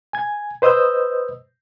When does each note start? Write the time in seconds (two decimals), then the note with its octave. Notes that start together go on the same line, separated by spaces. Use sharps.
0.13 G#5 G#6
0.62 B4 C5 D#5 D#6 E6 G6